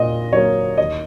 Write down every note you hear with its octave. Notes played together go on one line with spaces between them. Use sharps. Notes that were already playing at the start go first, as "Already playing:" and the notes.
Already playing: A#2 D#5
F#3 A#3 C#5
D#2 D#5